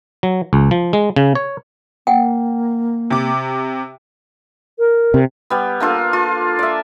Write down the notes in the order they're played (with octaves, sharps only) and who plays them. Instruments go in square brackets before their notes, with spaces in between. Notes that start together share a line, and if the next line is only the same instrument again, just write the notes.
[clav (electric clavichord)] F#3
C#2
F3
G#3
C#3
C#5
[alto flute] A#3 [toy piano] F#5 G5
[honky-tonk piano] C3 D6
[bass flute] A#4
[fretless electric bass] C3
[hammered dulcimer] G3 B3
A#3 D4 F4 A4
F4
D5 E5